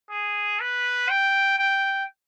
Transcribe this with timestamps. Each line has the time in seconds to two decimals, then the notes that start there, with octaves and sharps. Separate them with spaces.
0.10 G#4
0.60 B4
1.10 G5
1.58 G5